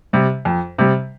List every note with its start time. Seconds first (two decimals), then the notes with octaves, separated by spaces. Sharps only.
0.13 C3 G3
0.45 F2
0.78 C3 G3